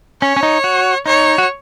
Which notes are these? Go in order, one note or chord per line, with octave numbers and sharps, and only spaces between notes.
C#4 C#5
C#4
D#4
F#4
D#4 C#5
F#4